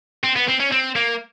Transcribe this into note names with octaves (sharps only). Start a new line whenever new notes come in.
C4
B3
C4
C#4
C4
A#3